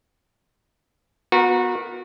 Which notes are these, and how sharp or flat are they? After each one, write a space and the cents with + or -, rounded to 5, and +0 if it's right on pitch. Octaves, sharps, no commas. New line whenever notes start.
B3 +0 F#4 -30 A#4 +10